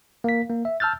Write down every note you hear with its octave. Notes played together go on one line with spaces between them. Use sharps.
A#3 B6
A#3
E5
A5 E6 F6 G6 A6